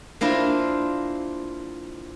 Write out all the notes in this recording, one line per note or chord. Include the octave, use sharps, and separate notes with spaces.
A#3 D4 E4 F4 C5